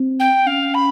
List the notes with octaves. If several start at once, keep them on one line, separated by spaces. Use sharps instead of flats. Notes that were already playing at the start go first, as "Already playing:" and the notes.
Already playing: C4
G5
C#4 F5
B5